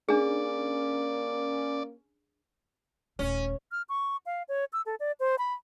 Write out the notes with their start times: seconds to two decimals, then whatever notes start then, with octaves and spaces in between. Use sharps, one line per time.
0.09 A#3 C#4 D4 G#4 D5
3.19 D#1 A3 C#4
3.71 F6
3.89 C#6
4.26 F5
4.48 C#5
4.73 E6
4.86 A4
5.00 D5
5.20 C5
5.38 B5